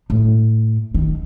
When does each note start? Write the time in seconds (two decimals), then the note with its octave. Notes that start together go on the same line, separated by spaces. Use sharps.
0.10 A2
0.94 D#3